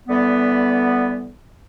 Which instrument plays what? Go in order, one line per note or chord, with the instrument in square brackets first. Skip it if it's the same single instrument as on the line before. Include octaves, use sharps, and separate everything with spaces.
[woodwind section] D3 E3 G3 B3